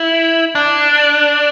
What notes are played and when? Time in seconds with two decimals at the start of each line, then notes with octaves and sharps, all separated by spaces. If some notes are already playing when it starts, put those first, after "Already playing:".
Already playing: E4
0.55 D4